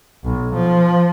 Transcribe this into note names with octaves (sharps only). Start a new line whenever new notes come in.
B1
F3